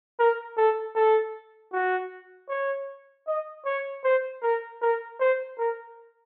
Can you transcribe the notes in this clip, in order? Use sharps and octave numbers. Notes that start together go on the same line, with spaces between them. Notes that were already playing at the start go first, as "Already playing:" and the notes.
A#4
A4
A4
F#4
C#5
D#5
C#5
C5
A#4
A#4
C5
A#4